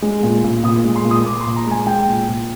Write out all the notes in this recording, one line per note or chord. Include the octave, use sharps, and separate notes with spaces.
G#3
A#2
A#2
A#2 D#6
G#3
C6
A#2
D#6
A#2 D6
C6
A#2
A#5
G#3 G#5
G#3 G5
A#2
A#2